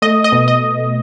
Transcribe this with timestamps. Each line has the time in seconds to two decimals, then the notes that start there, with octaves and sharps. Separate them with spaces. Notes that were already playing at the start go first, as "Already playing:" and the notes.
0.02 A3 D#5
0.24 D#5
0.32 B2
0.48 D#5